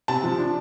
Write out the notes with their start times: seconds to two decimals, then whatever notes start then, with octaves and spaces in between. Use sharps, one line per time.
0.08 C3 A5
0.24 F3
0.39 D4